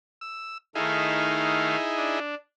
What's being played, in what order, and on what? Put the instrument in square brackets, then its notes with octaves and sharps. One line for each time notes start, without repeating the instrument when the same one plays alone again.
[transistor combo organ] E6
[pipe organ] D#3 A3 F5 [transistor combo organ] D#4 E4 G#4
[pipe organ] D4